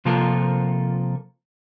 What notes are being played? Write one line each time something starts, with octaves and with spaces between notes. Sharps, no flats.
C3 F3 A#3 F4 A4 A#4